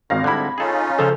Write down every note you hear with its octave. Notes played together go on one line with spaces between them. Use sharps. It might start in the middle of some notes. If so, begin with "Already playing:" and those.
G#1 A2 D#3 F5 A#6
G#2 D3 G3 G#3 E4 B5 G#6
C#4 D#4 F4 G#4 A4
C#3 F3 A4 C5 C#5